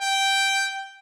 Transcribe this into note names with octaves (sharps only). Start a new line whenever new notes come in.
G5